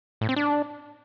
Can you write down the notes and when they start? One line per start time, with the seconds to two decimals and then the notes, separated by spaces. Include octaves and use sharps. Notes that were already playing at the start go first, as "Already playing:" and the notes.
0.21 A2
0.29 C4
0.36 D4